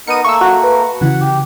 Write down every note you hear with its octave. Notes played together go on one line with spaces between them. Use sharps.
B3 D#4 A#4 C#7 D#7
A3 A#3 C#6 E6
F#4
B4
C#3 E3 F#5
G4